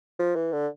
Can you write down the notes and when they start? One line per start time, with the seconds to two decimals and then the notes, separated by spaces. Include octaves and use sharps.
0.19 F3
0.36 E3
0.53 D3